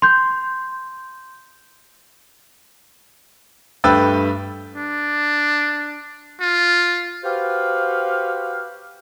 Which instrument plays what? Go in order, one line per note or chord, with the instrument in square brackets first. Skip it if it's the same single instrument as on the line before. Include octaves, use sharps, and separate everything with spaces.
[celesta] C6 G6
[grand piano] G2 A3 B4 G5 E6 A6
[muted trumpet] D4
F4
[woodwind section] F#4 G4 B4 C5 F5